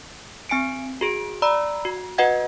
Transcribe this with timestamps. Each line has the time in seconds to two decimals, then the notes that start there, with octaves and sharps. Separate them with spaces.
0.49 C4 G#5 C#7 D7
1.01 F#4 G#4 D7
1.42 D5 A#5 B5 E6
1.85 F#4
2.18 F#4 B4 D#5 F#5 G#6